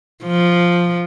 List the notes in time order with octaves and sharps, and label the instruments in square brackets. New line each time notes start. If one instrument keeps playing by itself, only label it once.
[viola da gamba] F3